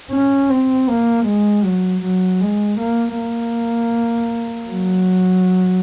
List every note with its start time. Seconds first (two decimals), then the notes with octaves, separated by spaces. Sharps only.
0.11 C#4
0.49 C4
0.88 A#3
1.26 G#3
1.63 F#3
2.03 F#3
2.40 G#3
2.79 A#3
3.17 A#3
4.69 F#3